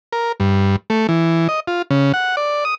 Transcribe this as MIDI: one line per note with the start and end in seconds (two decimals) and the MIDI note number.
0.13 0.32 70
0.40 0.76 43
0.90 1.07 57
1.09 1.48 52
1.49 1.60 75
1.68 1.82 65
1.91 2.12 49
2.14 2.36 78
2.37 2.64 74
2.65 2.75 87